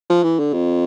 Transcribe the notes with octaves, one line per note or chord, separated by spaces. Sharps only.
F3
E3
D3
F2